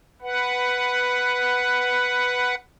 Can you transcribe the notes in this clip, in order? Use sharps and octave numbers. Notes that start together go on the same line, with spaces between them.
B4 F#5